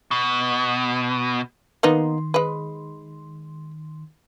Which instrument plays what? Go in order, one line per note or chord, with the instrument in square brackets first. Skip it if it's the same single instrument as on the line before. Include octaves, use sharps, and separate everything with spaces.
[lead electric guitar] B2
[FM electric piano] D#3 C6 [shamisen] A#3 B3 D#4
[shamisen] G#3 B4